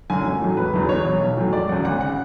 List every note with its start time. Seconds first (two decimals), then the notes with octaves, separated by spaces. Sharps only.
0.10 F#2 D3 F#3 G#5
0.25 A1
0.41 A2 F#3
0.57 E1 B4
0.74 E2 D3 F#3
0.89 E2 C#5
1.05 B2 F#3
1.21 B1
1.37 A2 F#3
1.53 E1 D5
1.69 D2 C#3 F#3 F#5
1.85 G#1 F#5
2.01 C#3 F#5